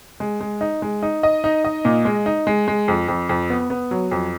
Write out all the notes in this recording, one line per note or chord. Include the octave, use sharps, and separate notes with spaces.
G#3
G#3
D#4
G#3
D#4
D#5
D#4
D#5
A#2
G#3
D#4
G#3
G#3
F2
F2
F2
B3
B3
F#3
F2